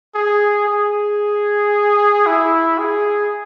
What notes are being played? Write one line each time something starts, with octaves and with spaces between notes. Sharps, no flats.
G#4
G#4
E4
G#4